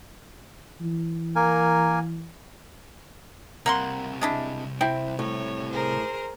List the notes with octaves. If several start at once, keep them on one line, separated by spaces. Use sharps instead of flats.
E3
A#3 A#4 G#5
C2 C3 A#3 F#5 C6
G#3 D4 E4
C4 E4 G5
A2 C#5
G#4 A#4 C5